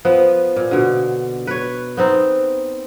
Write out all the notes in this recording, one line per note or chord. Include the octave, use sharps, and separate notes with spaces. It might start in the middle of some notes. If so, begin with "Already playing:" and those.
F3 B3
A#2
B2 D3
B4 C#5
B3 C4 D#4